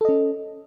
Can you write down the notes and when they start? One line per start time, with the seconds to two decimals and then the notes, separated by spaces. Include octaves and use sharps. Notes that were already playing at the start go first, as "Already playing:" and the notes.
0.01 A4
0.05 D#5
0.09 C#4